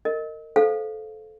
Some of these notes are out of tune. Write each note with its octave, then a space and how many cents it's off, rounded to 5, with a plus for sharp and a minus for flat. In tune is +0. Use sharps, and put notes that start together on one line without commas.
A#4 -30 D#5 +0
A4 -15 C5 +0 F5 +0